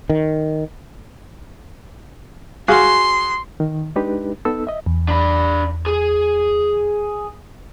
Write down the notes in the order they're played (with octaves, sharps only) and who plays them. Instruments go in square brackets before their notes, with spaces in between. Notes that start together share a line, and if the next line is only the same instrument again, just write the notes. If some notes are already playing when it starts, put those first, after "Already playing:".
[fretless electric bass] D#3
[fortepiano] F#4 G#4 F5 [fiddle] C6
[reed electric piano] D#3
G#3 D4 D#4 G4 B4
B3 D#4 A4 E6
D#5 E5
[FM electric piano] E2
[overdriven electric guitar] D4 B5
G#4